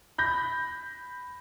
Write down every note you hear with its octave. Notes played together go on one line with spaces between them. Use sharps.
B5 G6 A#6